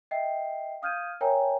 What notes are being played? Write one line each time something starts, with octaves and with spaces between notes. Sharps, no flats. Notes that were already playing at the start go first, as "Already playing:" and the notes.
D#5 E5 G5 C7
F5 D#6 F6 G6 G#6 D#7
A#4 C#5 E5 G5 G#5 A#5